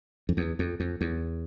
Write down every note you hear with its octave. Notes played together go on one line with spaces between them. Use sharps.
F2
E2
F2
F2
E2